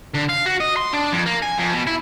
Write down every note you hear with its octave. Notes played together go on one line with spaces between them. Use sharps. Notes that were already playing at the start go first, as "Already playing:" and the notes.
D3
F5
F#4
D#5
C6
D4
F2
A#3
G#5
F2
B2
E4